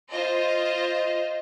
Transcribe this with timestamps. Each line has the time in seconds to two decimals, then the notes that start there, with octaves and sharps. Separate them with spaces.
0.11 F4 C5 D#5